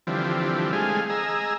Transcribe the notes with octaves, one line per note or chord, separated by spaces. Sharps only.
D3 E3 F3 G3 C4
G#3 A3 C4 G#4 F5
G#4 D#5 A#5 E6